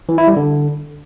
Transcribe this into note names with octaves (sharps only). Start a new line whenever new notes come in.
E3
E4
G3
D3